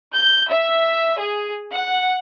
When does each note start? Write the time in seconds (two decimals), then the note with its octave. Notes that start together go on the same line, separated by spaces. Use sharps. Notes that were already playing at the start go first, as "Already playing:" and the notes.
0.14 G6
0.50 E5
1.18 G#4
1.70 F#5